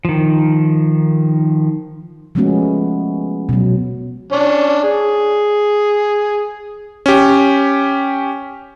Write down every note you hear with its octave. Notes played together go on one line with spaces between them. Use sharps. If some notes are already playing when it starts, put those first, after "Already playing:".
D#3 F3
F3 G#3 A3 B3 C#4 F#4
B2 F#3
C#4 D4
G#4
C#4 G4